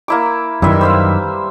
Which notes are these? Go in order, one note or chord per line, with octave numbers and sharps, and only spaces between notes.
A#3 E4 D6
F#2 D#3 G3 E4 B4 E5 C6
C5 E5 F5